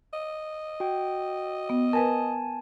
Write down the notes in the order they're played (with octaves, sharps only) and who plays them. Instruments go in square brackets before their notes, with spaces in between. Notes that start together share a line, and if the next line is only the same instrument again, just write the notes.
[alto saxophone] D#5
[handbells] F#4 G5
[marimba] B3
[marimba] A#4 B4 [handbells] G#5 A5